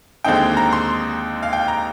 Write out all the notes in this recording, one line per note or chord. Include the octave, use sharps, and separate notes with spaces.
D#2 D3 G#3 C4 D#4 G5
A#5
C6
F5
G5
A#5